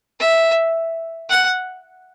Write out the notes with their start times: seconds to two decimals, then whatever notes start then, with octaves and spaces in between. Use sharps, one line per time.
0.20 E5
1.30 F#5